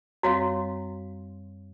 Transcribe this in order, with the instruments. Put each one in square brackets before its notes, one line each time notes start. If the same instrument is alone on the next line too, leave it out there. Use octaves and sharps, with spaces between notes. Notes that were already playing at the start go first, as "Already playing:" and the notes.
[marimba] F#2 G3 C4 [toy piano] F#4 C#5 F5